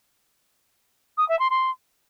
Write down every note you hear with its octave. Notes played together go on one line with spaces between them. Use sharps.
D#6
E5
C6
C6